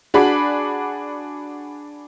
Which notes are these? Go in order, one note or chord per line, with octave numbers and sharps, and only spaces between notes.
D4 F#4 G#4 D5 B5